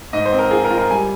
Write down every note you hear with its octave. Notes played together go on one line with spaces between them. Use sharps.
G#2 D#5
C5
C4
A#4
F4 G#4
A#4
F4
A#4
G3 G#5